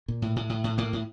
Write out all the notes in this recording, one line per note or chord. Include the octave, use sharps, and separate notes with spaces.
A#2
A2
A2
A2
A2
A2 A#3
A2